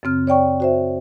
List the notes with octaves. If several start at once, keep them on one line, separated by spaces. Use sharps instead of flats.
F#2 C#3 C4 F6
C#5 D5 G5 C#6
F#4 C5 E5